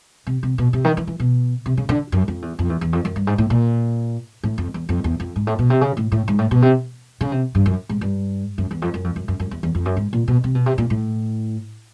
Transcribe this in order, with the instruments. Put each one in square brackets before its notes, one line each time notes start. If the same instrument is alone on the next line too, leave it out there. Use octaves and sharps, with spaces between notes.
[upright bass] C3
C3
B2
C3
D#3
E3
E3
B2
C3
C#3
D3
F#2
F2
E2
F2
E2
E2
F2
F#2
G2
G#2
A2
A#2
A2
F2
E2
F2
E2
F2
G#2
A2
B2
C3
C#3
A2
A2
G#2
A2
B2
C3
C#3
C3
G2
F#2
G#2
G2
F#2
E2
F2
F#2
F2
F#2
F#2
F#2
E2
E2
F2
F#2
G#2
A#2
B2
C3
B2
C3
A#2
A2